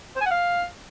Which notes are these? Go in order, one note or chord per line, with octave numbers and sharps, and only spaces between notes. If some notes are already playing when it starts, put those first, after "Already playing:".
C5
G#5
F#5
F5